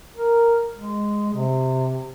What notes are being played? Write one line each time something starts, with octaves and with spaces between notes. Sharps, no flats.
A#4
G#3
C3